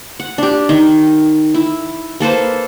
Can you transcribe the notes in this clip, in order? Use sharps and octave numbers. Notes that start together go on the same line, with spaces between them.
F#5
D4 G4
D#3
E4
A#3 A4 B4 C5